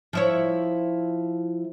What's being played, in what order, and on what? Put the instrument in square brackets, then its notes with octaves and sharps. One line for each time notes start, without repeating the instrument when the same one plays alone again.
[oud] F3 E4 C#5